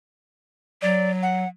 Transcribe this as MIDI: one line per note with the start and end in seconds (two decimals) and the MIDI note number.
0.82 1.44 54
0.82 1.11 74
1.22 1.48 78